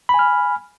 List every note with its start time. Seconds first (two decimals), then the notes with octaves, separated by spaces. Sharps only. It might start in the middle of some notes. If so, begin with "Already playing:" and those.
0.09 B5
0.14 G#5
0.19 F6